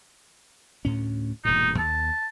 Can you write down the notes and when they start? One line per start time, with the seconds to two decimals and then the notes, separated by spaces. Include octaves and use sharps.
0.85 D2 A2 C#4
1.45 E1 G2 A#2 D#4
1.78 D#2 A5